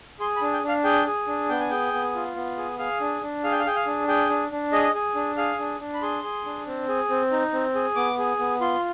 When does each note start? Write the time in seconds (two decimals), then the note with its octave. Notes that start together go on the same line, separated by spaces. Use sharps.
0.20 G#4 C6
0.36 B5
0.42 D4
0.53 G5
0.63 D4
0.68 F5
0.84 G#4 G5
1.06 G#4
1.27 D4
1.49 B3 G5
1.60 G#5
1.70 G#4 G5
1.93 B3
2.15 F4
2.36 B3
2.58 G#4
2.79 G#4 F5
3.00 D4
3.22 D4
3.44 G#4 F5
3.51 G5
3.59 F5
3.66 G#4 G5
3.76 F5
3.86 D4
4.08 G#4 G5
4.29 D4
4.51 D4
4.72 G#4 D#5
4.95 G#4
5.15 D4
5.37 G#4 F5
5.59 D4
5.80 D4
5.94 B5
6.02 G#4 C6
6.23 G#4
6.45 D4
6.66 C4
6.88 G#4
7.10 C4
7.31 D#4
7.52 C4
7.75 G#4
7.96 B3 D6
8.18 G#4
8.39 B3
8.61 F4 C6